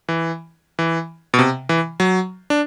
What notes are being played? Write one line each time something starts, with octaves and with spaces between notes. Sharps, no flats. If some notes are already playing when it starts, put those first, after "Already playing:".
E3
E3
B2
C3
E3
F#3
D4